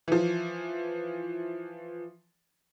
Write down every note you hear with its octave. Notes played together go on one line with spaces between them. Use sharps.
E3 F3